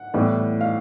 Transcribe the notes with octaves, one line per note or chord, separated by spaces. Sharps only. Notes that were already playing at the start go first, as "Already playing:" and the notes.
Already playing: F#5
A2 E3 G3 B3
F5